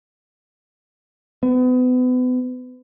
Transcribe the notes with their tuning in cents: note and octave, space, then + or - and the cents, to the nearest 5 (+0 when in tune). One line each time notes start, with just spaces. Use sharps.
B3 +35